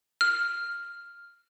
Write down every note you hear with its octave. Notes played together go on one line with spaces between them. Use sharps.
F6